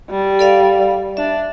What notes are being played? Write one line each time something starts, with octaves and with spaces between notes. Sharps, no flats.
G3
A4 D5 F5
D4 E5